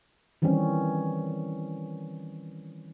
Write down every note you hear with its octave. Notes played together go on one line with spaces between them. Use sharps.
D#3 E3 G3 C4 C#4